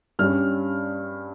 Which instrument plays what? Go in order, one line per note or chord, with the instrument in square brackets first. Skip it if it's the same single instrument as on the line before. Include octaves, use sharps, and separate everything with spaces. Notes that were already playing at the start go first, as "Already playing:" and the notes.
[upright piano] G2 G3 C#4 F6